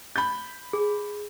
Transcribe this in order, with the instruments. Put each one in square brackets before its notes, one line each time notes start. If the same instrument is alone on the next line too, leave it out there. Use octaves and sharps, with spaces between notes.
[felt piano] B5 G6
[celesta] G#4